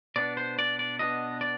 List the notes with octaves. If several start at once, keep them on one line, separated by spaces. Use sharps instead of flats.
B2 B3 D4 D5
C5
D5
D5
B2 B3 D4 D#5
D5